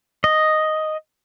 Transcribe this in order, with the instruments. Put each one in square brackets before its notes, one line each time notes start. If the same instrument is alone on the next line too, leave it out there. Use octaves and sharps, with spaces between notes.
[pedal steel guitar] D#5